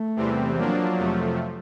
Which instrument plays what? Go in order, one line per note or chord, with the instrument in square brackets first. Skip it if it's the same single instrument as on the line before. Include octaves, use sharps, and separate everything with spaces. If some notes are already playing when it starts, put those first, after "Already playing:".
Already playing: [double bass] A3
[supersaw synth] E2 C3 E3 G3 C4
[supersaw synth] F3 A#3 D4 [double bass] F#3
[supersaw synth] F2 C3 F3 A3